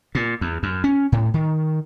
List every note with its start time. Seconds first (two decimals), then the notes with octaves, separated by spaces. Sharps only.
0.15 A#2
0.41 E2
0.63 F#2
0.84 C#4
1.12 A2
1.34 D#3